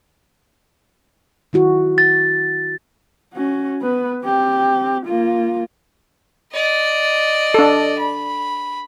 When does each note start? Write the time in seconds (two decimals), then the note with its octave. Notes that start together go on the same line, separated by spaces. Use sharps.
1.53 D#3 E4 F#4
1.98 A6
3.34 C#4 F#4
3.81 B3 B4
4.24 C4 G4
5.06 A#3 F4
6.53 D5 D#5
7.54 D4 A4
7.98 B5